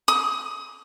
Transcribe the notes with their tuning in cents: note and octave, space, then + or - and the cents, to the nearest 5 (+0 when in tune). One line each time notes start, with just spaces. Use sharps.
D#6 +25